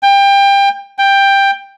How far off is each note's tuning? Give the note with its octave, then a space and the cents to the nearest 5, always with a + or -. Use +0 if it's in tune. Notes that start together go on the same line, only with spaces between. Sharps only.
G5 +25
G5 +10